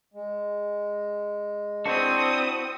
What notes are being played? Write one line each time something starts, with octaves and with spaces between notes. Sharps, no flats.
G#3
C4 D4 E4 F#4 C5 D#6